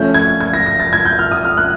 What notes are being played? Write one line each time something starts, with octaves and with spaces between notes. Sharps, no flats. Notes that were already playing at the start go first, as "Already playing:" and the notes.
Already playing: F3 A3 C#4 G6
G#6
G#6
A#6
A#6
A6
G#6
G6
F6
D#6
F6
F#6